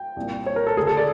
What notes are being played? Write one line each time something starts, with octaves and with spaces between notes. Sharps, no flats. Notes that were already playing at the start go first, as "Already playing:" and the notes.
Already playing: G5
C2 A#2
C#5
A#4
A4
D2 D3 G#4
A4
D5